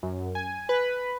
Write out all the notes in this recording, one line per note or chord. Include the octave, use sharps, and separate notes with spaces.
F#2
G#5
B4